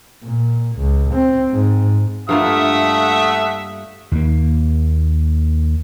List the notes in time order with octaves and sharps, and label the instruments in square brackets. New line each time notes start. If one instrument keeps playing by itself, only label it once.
[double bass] A#2
C#2
C4
G#2
[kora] G2 A#3 F4 [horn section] A3 E5 F#5 [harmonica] D#6
[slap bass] D#2 A#3